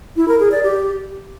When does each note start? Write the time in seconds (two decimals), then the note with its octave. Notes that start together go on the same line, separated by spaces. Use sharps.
0.16 E4
0.28 A#4
0.40 G#4
0.51 D5
0.63 G4